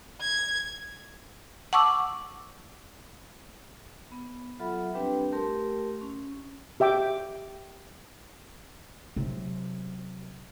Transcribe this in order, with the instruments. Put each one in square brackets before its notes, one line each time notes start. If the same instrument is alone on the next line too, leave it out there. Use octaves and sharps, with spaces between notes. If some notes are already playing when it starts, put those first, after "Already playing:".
[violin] G#6
[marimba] F#5 A5 C#6 D6 E6
[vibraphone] B3
F#3 F4 A4 E5 F#5 B5
G3 C4 D4 G4 B4 G5
A3 G4 A#4 C6
C#4
[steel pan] G4 E5 G5 D6
[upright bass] C3 F#3